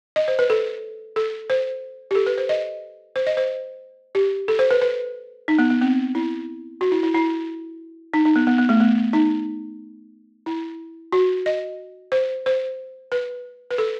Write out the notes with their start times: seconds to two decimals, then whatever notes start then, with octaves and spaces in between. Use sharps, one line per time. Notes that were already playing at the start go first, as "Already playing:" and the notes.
0.16 D#5
0.28 C5
0.39 B4
0.50 A4
1.16 A4
1.50 C5
2.11 G4
2.15 A4
2.26 B4
2.38 C5
2.49 D#5
3.16 C5
3.27 D#5
3.37 C5
4.15 G4
4.48 A4
4.59 C5
4.71 B4
4.82 B4
5.48 D#4
5.59 B3
5.70 B3
5.81 C4
6.15 E4
6.81 F#4
6.92 E4
7.03 E4
7.14 E4
8.14 D#4
8.25 D#4
8.36 B3
8.47 B3
8.58 B3
8.69 A3
8.80 B3
9.13 D#4
10.46 E4
11.12 F#4
11.46 D#5
12.12 C5
12.46 C5
13.12 B4
13.71 B4
13.78 A4